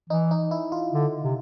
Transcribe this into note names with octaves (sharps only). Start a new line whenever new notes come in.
E3 D#4
D#4
E4
F4
D3
C3